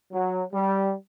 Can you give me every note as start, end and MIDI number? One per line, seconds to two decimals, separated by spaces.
0.12 0.43 54
0.54 0.94 55